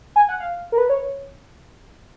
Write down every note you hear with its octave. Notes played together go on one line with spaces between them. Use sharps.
G#5
F#5
F5
A#4
B4
C#5